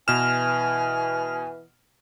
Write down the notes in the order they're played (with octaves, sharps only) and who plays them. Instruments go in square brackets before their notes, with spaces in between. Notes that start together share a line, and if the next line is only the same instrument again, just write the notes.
[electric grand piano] B2 E7 [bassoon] E3 [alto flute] G#5 [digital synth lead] F6